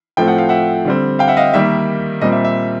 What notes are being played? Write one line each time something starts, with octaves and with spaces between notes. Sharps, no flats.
A2 F3 A3 C4 G5
F#5
F5
E5 F#5
D3 G3 C4
F5 G5
E5 F#5
D#5 F5
D#3 G3 A#3 E5
A#2 G3 C4 D#5
E5
E5